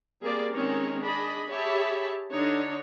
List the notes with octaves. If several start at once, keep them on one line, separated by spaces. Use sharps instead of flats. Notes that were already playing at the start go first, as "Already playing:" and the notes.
G3 A#3 C4 G#4 D5
D#3 G#3 C4 C#4 A#4 C#5
D4 G#4 D#5 B5
G4 G#4 C#5 E5 A5 B5
D3 D4 D#4 C#5